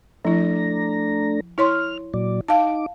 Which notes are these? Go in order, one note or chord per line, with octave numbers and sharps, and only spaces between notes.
F3 A3 D4 E4 A#5
E4 C#5 C6 F6
A#2 F#3 D5
D#4 F5 A5 D6